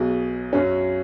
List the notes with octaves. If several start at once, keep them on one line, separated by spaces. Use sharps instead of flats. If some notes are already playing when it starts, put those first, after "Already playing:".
Already playing: B1 B2 F#3 G#4
F#2 F#3 C#4